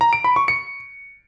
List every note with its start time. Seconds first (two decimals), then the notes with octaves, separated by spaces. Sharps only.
0.01 A#5
0.13 D7
0.24 B5
0.36 C#6
0.48 C#7